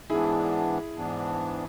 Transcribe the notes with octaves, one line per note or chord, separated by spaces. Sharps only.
G#2 E3 B3 D4 E4 G#4
G#2 E3 B3 D4